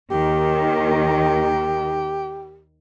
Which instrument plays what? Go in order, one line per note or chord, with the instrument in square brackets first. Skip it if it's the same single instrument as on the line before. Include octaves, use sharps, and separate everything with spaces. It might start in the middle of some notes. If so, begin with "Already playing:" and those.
[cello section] D#2 D#3 [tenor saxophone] G4